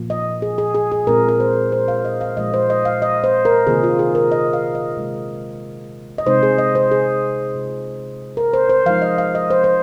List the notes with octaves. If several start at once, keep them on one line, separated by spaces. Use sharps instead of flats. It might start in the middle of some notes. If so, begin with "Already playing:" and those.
Already playing: A#2 F3 A#3 F4
D#5
G#4
G#4
G#4
G#4
A#2 G#3 C4 F4 A#4
A#4
C5
C5
F5
D#5
F5
A#2 F3 G#3 F4 D#5
C5
D#5
F5
D#5
C5
A#4
C3 D#3 A#3 F4 G#4
F4
G#4
A#4
D#5
F5
D#5
C3 G#3 F4
D#5
C3 G#3 D#4 C5
G#4
D#5
C5
G#4
C3 G#3 F4
A#4
C5
C5
F3 G#3 D#4 F5
D#5
F5
D#5
C5
C5